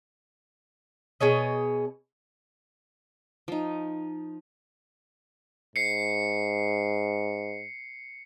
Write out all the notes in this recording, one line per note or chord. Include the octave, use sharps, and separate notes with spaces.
B2 G#4 C#5 D#5
F3 D#4
G#2 C7 C#7